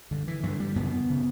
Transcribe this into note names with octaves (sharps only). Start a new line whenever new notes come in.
G2 D3
E3
G2 D3 E3
G3
F#2 C#3 B3
C#3